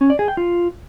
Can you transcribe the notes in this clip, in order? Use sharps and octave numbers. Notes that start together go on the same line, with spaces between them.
C#4
D5
G#4
G5
F4